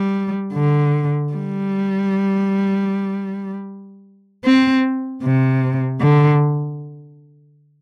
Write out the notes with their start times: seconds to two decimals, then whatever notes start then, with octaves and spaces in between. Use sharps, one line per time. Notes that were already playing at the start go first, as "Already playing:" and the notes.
Already playing: G3
0.53 D3
1.33 G3
4.45 C4
5.23 C3
6.01 D3